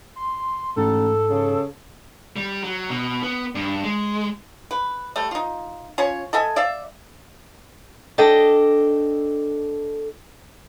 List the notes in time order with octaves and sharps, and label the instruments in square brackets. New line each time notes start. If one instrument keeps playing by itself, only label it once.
[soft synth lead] C6
[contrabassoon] A1 [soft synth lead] G#2 [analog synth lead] A4
[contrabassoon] C#3
[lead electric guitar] G3
F#3
B2
B3
G2
G#3
[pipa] B4
G3 A3
D#4 F4
C#4 F4 C#5
A4 D#5 E5 G#5
D5 E5 F5
[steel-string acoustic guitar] D4 A4 D#5 G5